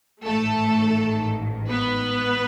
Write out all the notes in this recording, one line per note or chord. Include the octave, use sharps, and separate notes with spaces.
A1 G#2 D#3 A3 A4
B3 B4